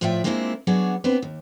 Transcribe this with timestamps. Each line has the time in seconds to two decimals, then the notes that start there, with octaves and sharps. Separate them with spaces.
0.01 A2 F3 F4 D5 E5 G5
0.24 G#3 A#3 C4 D4 E4 F4
0.67 F#3 B3 D4 F#4 G#4 D5
1.04 B3 C4 D4 B4 C5
1.22 D#2